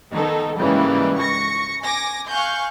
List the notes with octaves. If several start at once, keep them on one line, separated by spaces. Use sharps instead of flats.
D#3 B3 D#4 A4
G#2 C#3 E3 G3 A#3
C#6 A#6 C#7
G#5 D6 A#6
F5 G#5 C#6 F#6 G6